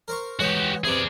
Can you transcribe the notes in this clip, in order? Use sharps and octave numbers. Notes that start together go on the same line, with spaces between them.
A#4 C5 C#6
E3 G#3 F#4 G4 C#5
C3 B3 E4 G#4 D5